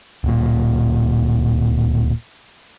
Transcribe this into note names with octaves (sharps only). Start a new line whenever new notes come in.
D1 A#2